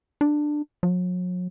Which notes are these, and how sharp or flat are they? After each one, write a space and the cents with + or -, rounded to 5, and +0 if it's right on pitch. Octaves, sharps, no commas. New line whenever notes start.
D4 +15
F#3 -40